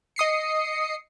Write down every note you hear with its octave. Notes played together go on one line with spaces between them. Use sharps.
D#5 D#6 C7 C#7